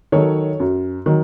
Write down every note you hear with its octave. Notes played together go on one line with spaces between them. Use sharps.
D#3 F#3 A4 C#5
F#2
D#3 F#3